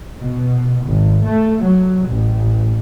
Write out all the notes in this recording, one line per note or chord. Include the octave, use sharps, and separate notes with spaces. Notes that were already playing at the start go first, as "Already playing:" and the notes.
B2
G#1
A3
F#3
A1